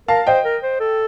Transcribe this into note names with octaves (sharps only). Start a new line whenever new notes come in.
A#4 F5 A5
C5 D#5 G5
A#4
C5
A4